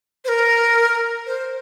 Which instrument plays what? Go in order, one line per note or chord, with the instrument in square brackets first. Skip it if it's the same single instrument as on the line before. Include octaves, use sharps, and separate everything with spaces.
[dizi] C5
A#4
C5